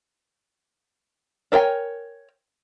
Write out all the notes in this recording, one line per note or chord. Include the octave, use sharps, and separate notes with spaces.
D4 A#4 C#5 G5 G#5